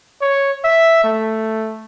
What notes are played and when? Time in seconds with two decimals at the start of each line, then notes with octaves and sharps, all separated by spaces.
0.22 C#5
0.65 E5
1.04 A3